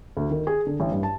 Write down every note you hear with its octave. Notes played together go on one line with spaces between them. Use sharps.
D2
D#3
G#4
D3
A1
G2
A5